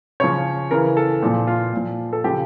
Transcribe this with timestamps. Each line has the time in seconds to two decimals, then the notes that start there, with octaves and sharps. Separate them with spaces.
0.20 C#3 F3 C#5
0.71 C#3 E3 A#4
0.97 A4
1.22 A#2 F3
1.47 F4
1.73 A#2 F3
2.13 A4
2.24 C#3 F3 G4